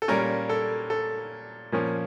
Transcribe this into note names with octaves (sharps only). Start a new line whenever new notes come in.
A4
A#2 G3 A#3 C#4 A#4
A4
A4
A#2 F3 A#3 C#4